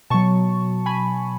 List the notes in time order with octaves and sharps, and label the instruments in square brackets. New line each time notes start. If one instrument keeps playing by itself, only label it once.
[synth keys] B2 F#3 A5 C#6
G#5 B5